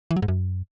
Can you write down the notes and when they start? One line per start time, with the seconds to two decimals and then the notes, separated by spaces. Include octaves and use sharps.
0.11 E3
0.16 F#3
0.22 G#2
0.28 F#2